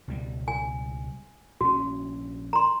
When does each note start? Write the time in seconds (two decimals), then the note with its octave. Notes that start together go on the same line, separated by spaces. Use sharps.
0.08 C#2 B2 G3
0.48 G#5
1.61 A#1 C#4 F#4
2.53 A#5 C6